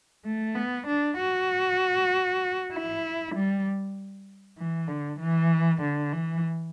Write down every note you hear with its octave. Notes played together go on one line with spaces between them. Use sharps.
A3
B3
D4
F#4
E4
G3
E3
D3
E3
D3
E3